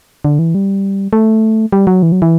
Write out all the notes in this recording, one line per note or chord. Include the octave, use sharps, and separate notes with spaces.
D3
E3
G3
A3
G3
F#3
E3
F#3
E3